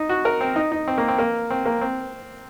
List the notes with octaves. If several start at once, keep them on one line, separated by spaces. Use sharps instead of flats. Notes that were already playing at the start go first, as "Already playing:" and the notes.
Already playing: D#4
F#4
A#4
C4
D#4
D#4
C4
A#3
C4
A#3
C4
A#3
C4